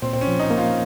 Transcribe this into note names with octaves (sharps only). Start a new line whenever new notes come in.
A#2 C4
C4
C#4
F3
D#4
A#3
F4